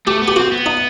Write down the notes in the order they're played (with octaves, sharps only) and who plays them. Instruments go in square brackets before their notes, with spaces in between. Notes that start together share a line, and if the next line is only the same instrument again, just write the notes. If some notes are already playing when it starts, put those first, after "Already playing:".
[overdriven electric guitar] A3 [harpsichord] G4
[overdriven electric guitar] B3
[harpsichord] G4
[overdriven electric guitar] C4 [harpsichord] F#4
[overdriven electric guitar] B3
[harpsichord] D#4